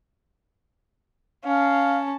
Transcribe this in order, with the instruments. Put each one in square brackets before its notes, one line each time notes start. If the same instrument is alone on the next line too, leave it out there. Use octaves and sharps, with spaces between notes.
[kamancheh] C#4 A5 [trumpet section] F5